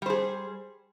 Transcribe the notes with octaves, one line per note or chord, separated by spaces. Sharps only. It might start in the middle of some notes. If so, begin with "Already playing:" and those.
G3 G#4 C5